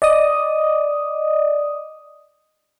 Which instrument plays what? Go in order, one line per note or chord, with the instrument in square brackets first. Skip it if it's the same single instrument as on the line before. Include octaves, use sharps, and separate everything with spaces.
[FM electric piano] D5 D#5 D#6